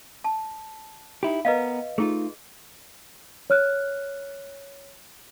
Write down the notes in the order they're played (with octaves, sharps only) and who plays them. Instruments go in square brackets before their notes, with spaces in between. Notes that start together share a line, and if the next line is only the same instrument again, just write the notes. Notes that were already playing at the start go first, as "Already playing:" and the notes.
[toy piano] A5
[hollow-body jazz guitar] D#4 E4 G4
[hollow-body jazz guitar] B3 A#4 [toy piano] B4 D#5 F5
[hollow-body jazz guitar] A3 D#4 F4 [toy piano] G#4
[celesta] C#5 F6 F#6